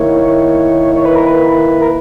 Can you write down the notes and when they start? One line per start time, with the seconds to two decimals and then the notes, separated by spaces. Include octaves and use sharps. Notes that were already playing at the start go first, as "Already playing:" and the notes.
Already playing: D#3 A#3 E4 C#5
0.95 C#5
1.05 B4
1.16 A#4
1.26 B4
1.81 A#4